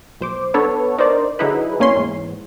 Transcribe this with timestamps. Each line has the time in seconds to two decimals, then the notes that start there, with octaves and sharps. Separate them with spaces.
0.21 B1 C5 D6
0.54 B3 D4 A4 B4 C#5
0.98 D4 D#4 A#4 C5 D5
1.39 D3 F#3 D#4 E4 G#4 B4
1.79 C2 A#3 C#4 C#5 C6
1.96 E2 G#2